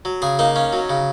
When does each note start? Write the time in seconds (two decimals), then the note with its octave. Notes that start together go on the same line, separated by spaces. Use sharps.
0.05 F#3
0.22 C#3 G#4
0.39 A#3 D#4
0.56 C#4
0.73 F#3
0.90 C#3